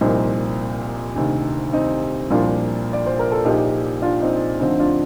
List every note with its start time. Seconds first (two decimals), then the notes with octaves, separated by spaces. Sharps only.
0.01 C2 A#2 F3 C4 D#4
1.16 D2 C3 D#3
1.73 C4 D#4
2.30 C2 A#2 F3 D4 F4
2.93 D5
3.06 C5
3.19 A#4
3.32 A4
3.45 A#1 A#2 F3 D#4 G4
4.02 D4 F4
4.22 C4 D#4
4.60 D2 D3 F3 C4 D#4
4.79 D4 F4